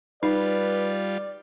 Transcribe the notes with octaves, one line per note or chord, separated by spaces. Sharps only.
G3 D#4 F4 B4 D5